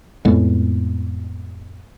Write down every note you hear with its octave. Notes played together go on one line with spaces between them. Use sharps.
F2 A2 G#3 B3